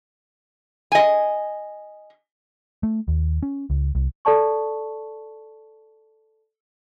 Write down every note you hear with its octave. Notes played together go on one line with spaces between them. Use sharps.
D#5 G#5
A3
D#2
C#4
C#2
C2
A4 D5 A5 C#6